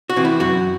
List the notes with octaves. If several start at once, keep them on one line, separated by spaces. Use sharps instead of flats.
F#4
C3 E3
E4
F#2 F#4